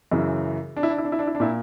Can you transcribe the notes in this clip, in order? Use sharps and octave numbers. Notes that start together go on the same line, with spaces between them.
F#2 C#3 E3
D4
E4
D4
E4
D4
E4
D4
E4
D4
A#2 E4